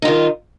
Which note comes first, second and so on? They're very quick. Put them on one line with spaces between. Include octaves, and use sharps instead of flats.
D#4 F4 D#3